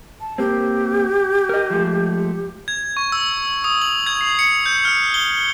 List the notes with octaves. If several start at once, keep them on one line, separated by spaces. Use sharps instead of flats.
A5
A#3 C4 G4
A#4 D#5
F3 G#3 A3
G#6
C#6
E6
D#6
F#7
G#6
C7
C#7
G6
F6
G7